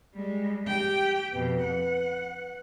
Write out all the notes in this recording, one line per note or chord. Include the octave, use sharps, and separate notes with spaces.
G3 G#3
G4 G5
F2 B2 B4
F#5